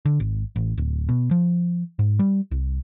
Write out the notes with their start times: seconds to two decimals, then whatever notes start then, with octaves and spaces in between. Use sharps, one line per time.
0.05 D3
0.20 G#1
0.56 A1
0.78 D1
1.09 B2
1.31 F3
1.99 G#2
2.19 G3
2.51 C2